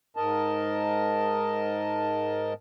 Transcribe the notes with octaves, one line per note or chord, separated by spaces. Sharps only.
G#2 A#4 D#5 A5